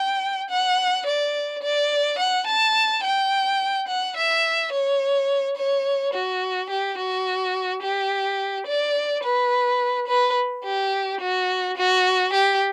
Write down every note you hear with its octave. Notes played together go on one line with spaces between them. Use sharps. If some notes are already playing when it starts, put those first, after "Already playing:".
Already playing: G5
F#5
D5
D5
F#5
A5
G5
F#5
E5
C#5
C#5
F#4
G4
F#4
G4
D5
B4
B4
G4
F#4
F#4
G4